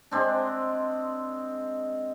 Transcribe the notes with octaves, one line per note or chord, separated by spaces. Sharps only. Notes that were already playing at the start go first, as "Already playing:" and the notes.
G#3 C4 D4